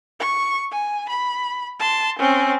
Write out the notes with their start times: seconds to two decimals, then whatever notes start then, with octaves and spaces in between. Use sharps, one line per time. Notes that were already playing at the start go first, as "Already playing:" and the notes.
0.20 C#6
0.71 G#5
1.09 B5
1.79 A5 C6
2.19 C4 C#4